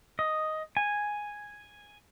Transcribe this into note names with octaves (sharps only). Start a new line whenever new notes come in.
D#5
G#5